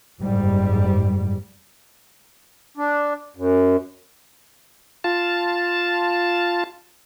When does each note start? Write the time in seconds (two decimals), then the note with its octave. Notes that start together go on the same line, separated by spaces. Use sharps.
0.20 F#1 G#2 G3
2.77 D4
3.36 F#2
5.04 F4 A5